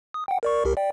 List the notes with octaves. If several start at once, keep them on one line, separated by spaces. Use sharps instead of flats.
D#6
F#5 G5
A#4 D5 C#6
C2 G4 A#4
D5 G5